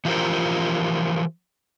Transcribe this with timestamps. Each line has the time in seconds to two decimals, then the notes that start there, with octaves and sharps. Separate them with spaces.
0.05 E3 F3 F4 G4 A#4 C5